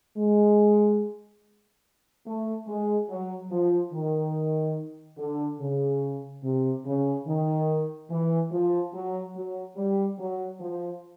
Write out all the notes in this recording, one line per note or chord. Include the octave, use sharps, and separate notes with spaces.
G#3
A3
G#3
F#3
F3
D#3
D3
C#3
C3
C#3
D#3
E3
F3
F#3
F#3
G3
F#3
F3